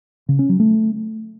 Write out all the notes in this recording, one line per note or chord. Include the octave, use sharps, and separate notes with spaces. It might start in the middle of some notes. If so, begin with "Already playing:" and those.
C#3
C#4
F#3
A3